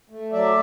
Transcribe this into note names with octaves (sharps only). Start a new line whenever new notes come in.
A3
F#3 D5 E5